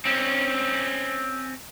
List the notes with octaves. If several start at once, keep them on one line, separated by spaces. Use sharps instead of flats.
C4 C#4